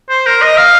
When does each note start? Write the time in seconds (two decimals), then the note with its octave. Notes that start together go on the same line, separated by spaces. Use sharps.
0.10 C5
0.26 A#4
0.42 D#5
0.57 F5